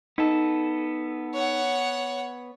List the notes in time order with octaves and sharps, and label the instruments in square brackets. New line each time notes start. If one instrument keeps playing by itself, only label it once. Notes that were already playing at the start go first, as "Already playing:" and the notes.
[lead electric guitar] B3 A4 [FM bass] D#4
[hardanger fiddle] C#5 F#5